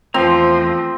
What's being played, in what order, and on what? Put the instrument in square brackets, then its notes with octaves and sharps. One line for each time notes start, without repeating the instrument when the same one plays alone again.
[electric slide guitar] E2 A3 A#5 [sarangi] F3 [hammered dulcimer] C4